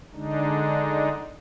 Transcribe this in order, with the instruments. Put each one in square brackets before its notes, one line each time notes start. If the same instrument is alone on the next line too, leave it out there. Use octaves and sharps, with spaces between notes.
[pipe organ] D3 G#3 D4 D#4